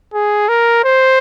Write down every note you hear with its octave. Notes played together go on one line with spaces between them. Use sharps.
G#4
A#4
C5